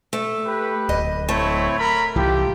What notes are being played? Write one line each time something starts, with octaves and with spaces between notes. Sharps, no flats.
A3
G4 B4
D1 D#5
A3 C4 E4 C#5
A#4 B5
C2 A2 E3 F4 G4